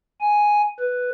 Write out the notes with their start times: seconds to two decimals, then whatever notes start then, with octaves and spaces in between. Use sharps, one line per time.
0.21 G#5
0.79 B4